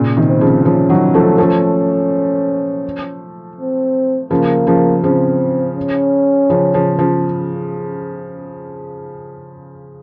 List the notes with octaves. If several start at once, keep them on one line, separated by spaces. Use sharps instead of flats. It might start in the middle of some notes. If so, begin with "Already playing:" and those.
Already playing: A#2 C#3
C3 D#3
C4
C#3 F3
C#3 F3 C#4
D#3 F#3
F3 A3
F3 A3
C4
C#3 F3 A#3
C#3 F3
C#3 F3 C4
C#4
C#3 F3
C#3 F3
C#3 F3